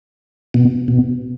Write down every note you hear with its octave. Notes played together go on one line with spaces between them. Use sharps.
B2
B2